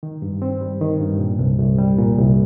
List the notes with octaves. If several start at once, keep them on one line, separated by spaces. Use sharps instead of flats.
D#3
G2
C4
G3
D#3
G2
A#2
C2
C2
G3
A#2
C2